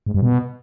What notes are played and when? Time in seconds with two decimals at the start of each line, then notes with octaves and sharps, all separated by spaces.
0.07 G#2
0.14 G2
0.22 B2